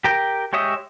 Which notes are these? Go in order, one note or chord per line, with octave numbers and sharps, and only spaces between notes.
G4 A#4 G5
G#3 G4 C#5 E5 D#6